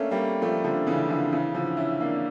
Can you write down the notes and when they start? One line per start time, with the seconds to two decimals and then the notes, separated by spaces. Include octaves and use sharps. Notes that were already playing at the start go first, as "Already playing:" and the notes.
Already playing: A3 A#3 C#4 D4
0.11 G3 A#3
0.42 F3 A3
0.64 D3 F3
0.87 C#3 E3
1.09 D3 F3
1.32 C#3 E3
1.54 D3 F3
1.77 C#4 E4
2.00 A#3 D4